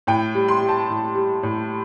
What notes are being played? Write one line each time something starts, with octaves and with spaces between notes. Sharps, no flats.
A2 G5
G3
C6
G3
A5
A2
G3
A2